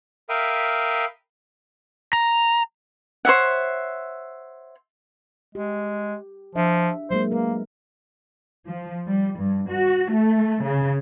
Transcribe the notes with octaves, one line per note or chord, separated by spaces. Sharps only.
A#4 E5 F5 G5 B5 D#6
A#5
C5 C#5 E5 F#5
G#3 G4
F3 D4 E5
F#3 G#3 A#3 C5
A3 A#3 A#4 B4
F3
G3
G2
F#4
A3
C#3